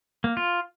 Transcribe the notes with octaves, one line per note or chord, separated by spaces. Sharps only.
A#3
F4